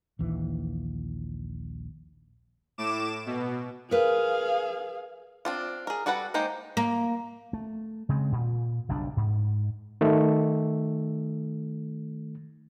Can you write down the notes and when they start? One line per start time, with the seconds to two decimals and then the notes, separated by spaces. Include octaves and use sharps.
0.19 A#1 D#2 E3
2.78 A2 D6 E7
3.26 B2
3.91 G#4 A#4 B4 F5
5.45 C4 D4 F4
5.87 G#4 A#4
6.06 G3 F#4 A4 B4 F#5
6.34 G#3 A#3 D#4 G4 C5
6.77 A#3
7.53 A3
8.09 C#3 G#3 C4
8.32 A#2
8.89 F#1 B1 G3 D4
9.17 G#2
10.01 D#3 A3